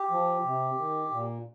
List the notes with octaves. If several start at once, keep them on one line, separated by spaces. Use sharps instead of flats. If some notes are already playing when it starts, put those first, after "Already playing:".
Already playing: G4
F3
C3
D#3
A#2